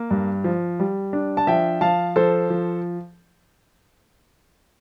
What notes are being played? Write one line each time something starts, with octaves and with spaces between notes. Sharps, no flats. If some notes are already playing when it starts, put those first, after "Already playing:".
Already playing: A#3
G2
F3
G3
D4
A5
F3 E5 G5
F3 F5 A5
F3 A4 C5
F3